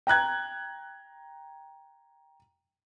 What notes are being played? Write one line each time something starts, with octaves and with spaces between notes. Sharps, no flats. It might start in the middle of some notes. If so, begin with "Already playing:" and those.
G5 A#5 F#6 G#6